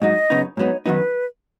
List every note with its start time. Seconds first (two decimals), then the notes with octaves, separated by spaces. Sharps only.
0.01 G#2 F#3 D#4 D#5
0.30 F#2 C#3 B3 D#4
0.57 G#2 F#3 B3 D#4 C#5
0.86 F#2 D#3 F#3 B3 D#4 B4